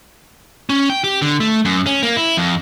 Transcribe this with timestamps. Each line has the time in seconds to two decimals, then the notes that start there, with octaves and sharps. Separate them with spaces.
0.70 C#4
0.90 G5
1.04 G4
1.22 D3
1.40 A3
1.65 F#2
1.87 C#4
2.03 A#3
2.17 E4
2.37 F2